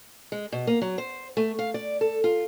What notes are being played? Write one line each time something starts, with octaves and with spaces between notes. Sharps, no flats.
G#3
B2
A#3
F#3
C5
A3
F5
D5
A4
F4